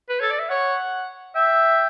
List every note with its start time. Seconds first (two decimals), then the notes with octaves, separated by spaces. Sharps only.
0.09 B4
0.20 A4 C#5
0.30 D5
0.39 E5
0.49 C#5 F#5
1.35 E5 G5